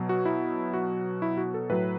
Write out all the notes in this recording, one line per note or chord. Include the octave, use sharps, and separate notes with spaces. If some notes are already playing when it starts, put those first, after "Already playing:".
Already playing: B2 F#3
F#4
E4
F#4
E4
F#4
A4
A2 F#3 B4